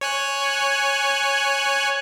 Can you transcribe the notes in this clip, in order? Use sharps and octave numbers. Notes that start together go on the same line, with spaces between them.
C#5 G#5 F#6